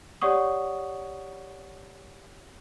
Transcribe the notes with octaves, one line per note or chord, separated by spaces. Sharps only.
G4 C#5 D5 F#5 C#6 D#6